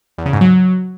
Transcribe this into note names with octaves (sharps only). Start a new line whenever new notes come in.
E2
C#3
G#2
F#3